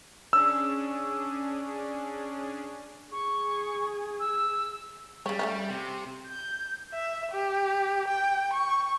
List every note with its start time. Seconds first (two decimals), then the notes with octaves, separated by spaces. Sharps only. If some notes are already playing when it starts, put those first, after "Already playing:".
0.33 C#4 D4 G#4 E6
3.12 G#4 C#6
4.20 E6
5.26 C#3 G3 C#5
5.39 A3 C#4 F4
5.70 C3
6.27 G6
6.93 E5
7.31 G4
8.08 G5
8.53 C#6